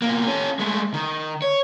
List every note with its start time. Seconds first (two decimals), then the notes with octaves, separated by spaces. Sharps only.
0.02 B2 A#3
0.26 C#4 A4
0.59 G#3 A3
0.94 D#3
1.42 C#5